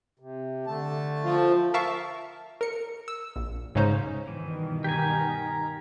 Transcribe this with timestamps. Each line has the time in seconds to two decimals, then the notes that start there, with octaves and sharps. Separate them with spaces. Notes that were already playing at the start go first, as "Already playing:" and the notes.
0.19 C3
0.67 D3 A3 A5
1.23 F3
1.74 A#4 E5 F5 A5 C#6
2.61 A#4 C#7
3.08 E6
3.36 A#1
3.75 G#2 C#3 G#3 C#4 D#4 C5
4.28 G2 B2 D#3 E3
4.84 G4 A#4 G#5 A#5